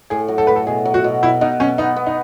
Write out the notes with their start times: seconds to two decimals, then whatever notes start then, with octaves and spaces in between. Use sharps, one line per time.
0.10 A2 G#4
0.28 F#3
0.38 A4
0.47 A2 B4
0.56 A4
0.67 B2 G#4
0.85 F#3
0.94 F#4
1.04 B2
1.23 B2 E4
1.41 B2 D#4
1.60 B2 C#4
1.78 B3 D#4
1.96 B3
2.06 D#4